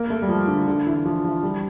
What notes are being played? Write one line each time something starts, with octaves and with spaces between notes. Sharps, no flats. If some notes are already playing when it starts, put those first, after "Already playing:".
Already playing: A#3
A3
G3
F3
D3
D3
E3
F3
F3
G3